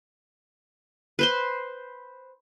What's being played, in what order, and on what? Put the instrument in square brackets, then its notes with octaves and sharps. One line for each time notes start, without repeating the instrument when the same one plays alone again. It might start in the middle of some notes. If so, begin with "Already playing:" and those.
[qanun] B4 C5 C6